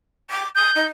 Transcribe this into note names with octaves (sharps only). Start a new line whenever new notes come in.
D6
D#6 G6
D#4